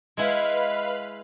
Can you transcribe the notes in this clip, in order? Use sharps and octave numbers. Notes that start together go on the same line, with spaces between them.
G#3 E4 B4 F5 B5